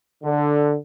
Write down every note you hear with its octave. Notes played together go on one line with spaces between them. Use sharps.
D3